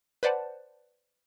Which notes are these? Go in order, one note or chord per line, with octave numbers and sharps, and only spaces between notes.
B4 C5 D5 F#5 A5